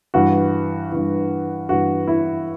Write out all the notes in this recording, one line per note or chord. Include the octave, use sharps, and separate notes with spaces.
G2 E3 F#4
G2 E3
G2 E3 F#4
E4